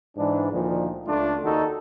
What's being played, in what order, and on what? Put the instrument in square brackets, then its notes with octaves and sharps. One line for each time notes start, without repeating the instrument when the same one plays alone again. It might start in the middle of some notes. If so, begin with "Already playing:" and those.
[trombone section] G#2 E3 D4
D2 A#2 D#3 F3
C#2 A3 D4 F4
D#2 D#3 D#4 F#4 A4